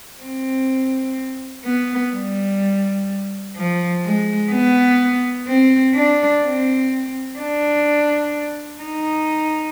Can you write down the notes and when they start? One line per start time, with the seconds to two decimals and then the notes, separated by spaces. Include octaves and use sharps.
0.22 C4
1.65 B3
2.14 G3
3.57 F3
4.05 G#3
4.51 B3
5.47 C4
5.95 D4
6.44 C4
7.39 D4
8.82 D#4